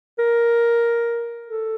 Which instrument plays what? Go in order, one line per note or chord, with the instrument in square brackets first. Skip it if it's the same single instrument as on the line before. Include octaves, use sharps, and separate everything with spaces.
[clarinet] A#4
A4